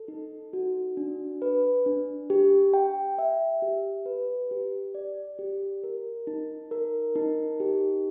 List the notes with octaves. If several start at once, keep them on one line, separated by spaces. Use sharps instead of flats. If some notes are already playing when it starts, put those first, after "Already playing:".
Already playing: A4
D#4
F#4
D4
B4
D4
G4
G5
E5
G4
B4
G4
D5
G4
A#4
D#4
A#4
D#4
G4